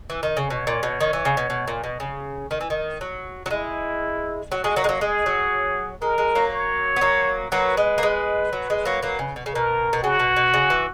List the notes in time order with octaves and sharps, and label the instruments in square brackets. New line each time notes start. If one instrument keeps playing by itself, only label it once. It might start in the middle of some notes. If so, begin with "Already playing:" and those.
[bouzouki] E3
D#3
C#3
[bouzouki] B2 [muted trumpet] C#5
[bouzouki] A#2
B2
D#3
E3
C#3
B2
B2
A#2
B2
C#3
D#3
E3
D#3
F#3
F#3
[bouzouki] G#3 [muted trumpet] E4
[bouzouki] F#3 [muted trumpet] F#4
[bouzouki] G#3
F#3 A#3
G#3
F#3 A#3
[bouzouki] G#3 [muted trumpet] G#4
[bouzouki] F#3
[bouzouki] G#3 [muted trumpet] A#4
[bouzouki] G#3
F#3 A#3
[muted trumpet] C#5
[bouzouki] B3
F#3 A#3
[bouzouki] F#3 A#3 [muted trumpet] B4
[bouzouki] G#3
A#3
G#3
F#3
G#3
F#3 A#3
F#3 A#3
C#3
B2
C#3
[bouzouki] B2 [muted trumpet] A#4
[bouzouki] B2
[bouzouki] C#3 [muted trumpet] F#4
[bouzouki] B2
B2
C#3
E3